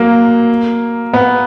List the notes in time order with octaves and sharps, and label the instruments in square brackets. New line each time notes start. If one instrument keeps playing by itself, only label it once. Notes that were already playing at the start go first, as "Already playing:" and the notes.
Already playing: [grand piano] F#3 A#3
B3